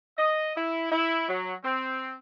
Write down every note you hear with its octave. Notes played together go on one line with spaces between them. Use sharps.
D#5
E4
E4
F#3
C4